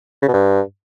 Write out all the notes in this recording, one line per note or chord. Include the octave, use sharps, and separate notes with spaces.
C#3
B2
G2